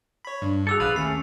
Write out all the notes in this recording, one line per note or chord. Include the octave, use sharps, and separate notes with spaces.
C#5 B5
G2 D4
F#4 G#4 A4 D6 E6 F7
A#1 B4 F5 E6 A6 F7
D#2 A3 C#4 A6 C7